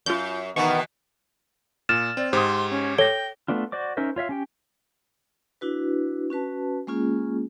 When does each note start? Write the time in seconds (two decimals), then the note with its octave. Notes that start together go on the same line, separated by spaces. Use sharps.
0.06 F#2 F4 G6
0.56 B2 D#3 E3 B3 C#6
1.89 A#2 F6 A6 E7
2.17 C4 D5
2.33 G#2 G4 C5 C6 D#6
2.71 C#4
2.98 A4 C#5 G5 A#6 G7
3.48 A3 B3 D4 F4
3.72 F#4 C5 D5 D6
3.97 C#4 D#4 A#4 C5 E5
4.16 F4 C#5 E5 F5
4.29 C#4 G4 G5
5.61 D4 E4 F#4 B4
6.30 C#4 F#4 B4 A5
6.87 G#3 A#3 C#4 F4 G#4